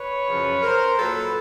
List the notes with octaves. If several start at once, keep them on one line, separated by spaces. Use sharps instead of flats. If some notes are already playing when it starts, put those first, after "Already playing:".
Already playing: B4 C#5
F#2 C#3 F3
A#4 C5
A#2 F#3 A4 B4